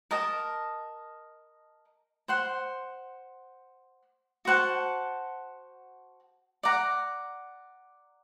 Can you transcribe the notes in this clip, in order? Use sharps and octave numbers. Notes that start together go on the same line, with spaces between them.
A#4 D#5 A5
C5 F#5 C6
F#4 C5 F#5 A5
D5 F#5 A#5